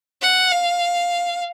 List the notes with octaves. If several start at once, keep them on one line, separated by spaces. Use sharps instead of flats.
F#5
F5